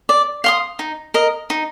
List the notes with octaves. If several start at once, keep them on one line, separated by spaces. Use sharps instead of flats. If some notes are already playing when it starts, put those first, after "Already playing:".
D5
F5 C6 D#6
D#4
A#4 D#5
D#4